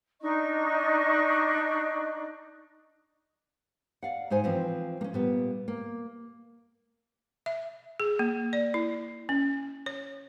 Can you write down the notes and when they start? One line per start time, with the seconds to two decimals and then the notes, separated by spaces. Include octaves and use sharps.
0.20 D4 D#4 D#5 C#6
4.03 D5 F5 F#5
4.30 G#2 D#4 C5 G#5
4.44 E3 F3 C4
5.01 A#3 C#4
5.13 A#2 G3 B3
5.68 A#3
7.46 E5
8.00 G#4
8.19 A#3
8.53 D5
8.74 E4
9.29 C#4
9.86 C#5